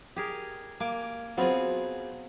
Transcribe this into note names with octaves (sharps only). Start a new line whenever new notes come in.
G4 G#4 A#4
A#3 G#5 D6
F#3 B3 C4 F4 G#4